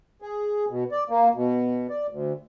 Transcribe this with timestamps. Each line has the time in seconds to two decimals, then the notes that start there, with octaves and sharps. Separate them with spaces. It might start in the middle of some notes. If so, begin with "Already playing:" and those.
0.22 G#4
0.69 B2
0.92 D5
1.10 A#3
1.35 B2
1.90 D5
2.10 D2